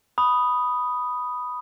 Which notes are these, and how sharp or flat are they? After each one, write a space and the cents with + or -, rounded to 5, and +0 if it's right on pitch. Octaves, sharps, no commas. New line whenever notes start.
B5 +0 D#6 +0